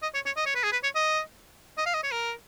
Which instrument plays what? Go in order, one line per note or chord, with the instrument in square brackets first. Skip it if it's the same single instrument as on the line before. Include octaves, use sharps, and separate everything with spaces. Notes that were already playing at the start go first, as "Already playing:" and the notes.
[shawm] D#5
C#5
C#5
D#5
C#5
B4
G#4
B4
C#5
D#5
D#5
F5
D#5
C#5
A#4